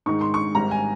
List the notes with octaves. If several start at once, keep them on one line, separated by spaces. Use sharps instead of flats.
G#2 D#3 G#3 D#4 C#6
C6
C#6
G#1 G#2 G3 A#5
G#5